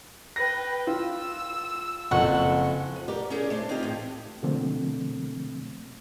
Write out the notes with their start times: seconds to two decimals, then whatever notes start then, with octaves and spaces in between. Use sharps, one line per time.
0.36 B4 G5 A#6
0.87 F4 E6
2.11 F#1 F2 F#5 C#6
2.96 F3
3.08 G4 A#4 B4 D5
3.30 C#4 E4 G4 G#4 A#4 D5
3.50 A3 D4 C5
3.69 A#3 C4 D#4 F4 G4
3.83 A2 E3
4.43 B2 D3 F3 A3 A#3 C4